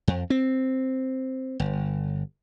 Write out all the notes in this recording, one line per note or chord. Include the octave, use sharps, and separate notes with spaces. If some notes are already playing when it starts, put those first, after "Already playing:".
F2
C4
G1